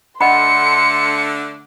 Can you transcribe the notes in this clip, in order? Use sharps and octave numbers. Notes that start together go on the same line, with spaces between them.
D3 A3 D4 D#5 F#5 B5 C6 C#7